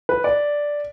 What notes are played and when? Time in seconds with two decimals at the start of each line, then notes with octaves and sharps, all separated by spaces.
0.09 B4
0.24 D5